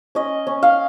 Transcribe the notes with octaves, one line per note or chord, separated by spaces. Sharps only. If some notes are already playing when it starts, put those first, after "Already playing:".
C#4 D#5
C#4
F5